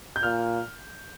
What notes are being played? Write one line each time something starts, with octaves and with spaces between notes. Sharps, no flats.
G6
A#2 F6